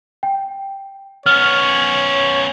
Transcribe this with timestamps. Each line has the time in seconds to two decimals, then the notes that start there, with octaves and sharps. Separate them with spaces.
0.23 G5
1.26 B3 C#4 C#5 F6